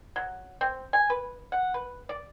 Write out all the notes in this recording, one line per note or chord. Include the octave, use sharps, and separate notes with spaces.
F#3
C4
G#5
B4
F#5
B4
D5